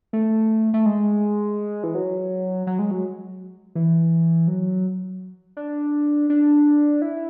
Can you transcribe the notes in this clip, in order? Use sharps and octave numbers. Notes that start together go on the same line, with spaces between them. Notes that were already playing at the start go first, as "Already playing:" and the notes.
A3
A3
G#3
E3
F#3
F#3
G#3
F#3
E3
F#3
D4
D4
E4